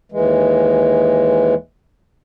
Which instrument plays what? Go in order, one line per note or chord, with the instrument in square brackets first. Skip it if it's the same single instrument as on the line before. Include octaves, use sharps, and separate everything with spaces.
[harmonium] D#2 E3 G#3